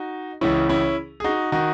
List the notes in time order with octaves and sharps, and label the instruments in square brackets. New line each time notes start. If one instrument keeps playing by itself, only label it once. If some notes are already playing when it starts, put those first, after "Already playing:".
Already playing: [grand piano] D#4 F#4
C#2 C#3 E3 C#4 E4
C#4 E4
G#4
D#4 F#4
D#3 D#4 F#4